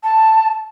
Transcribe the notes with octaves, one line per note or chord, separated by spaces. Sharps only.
A5